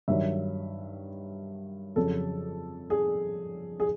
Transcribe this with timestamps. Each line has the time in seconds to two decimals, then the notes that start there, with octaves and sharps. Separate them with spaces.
0.08 G2 D#3 F#3 E5
1.96 F2 C#3 F#3 A4
2.90 G#4
3.80 G#4